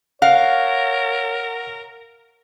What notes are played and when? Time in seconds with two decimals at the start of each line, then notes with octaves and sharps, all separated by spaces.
0.22 A#4 C#5 F5 F#5